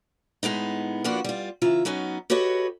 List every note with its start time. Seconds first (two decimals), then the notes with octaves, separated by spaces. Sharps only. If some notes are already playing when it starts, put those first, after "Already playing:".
0.43 A2 G#3 B3 D#4
1.04 F3 A#3 D4 F4 F#4 B4
1.24 G3 F4
1.62 C#3 E3 F4 E5 A#5
1.85 F#3 B3 C#4 D#4
2.30 F#4 G4 A4 B4 C#5 D#5